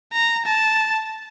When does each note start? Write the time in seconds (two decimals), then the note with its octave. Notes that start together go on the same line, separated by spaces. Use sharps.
0.13 A#5
0.46 A5